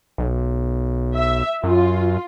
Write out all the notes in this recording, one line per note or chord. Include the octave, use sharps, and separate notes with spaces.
B1
E5
F#2 F4